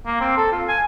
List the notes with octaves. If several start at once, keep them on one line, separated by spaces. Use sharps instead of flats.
A#3
C4
A4
F4
G#5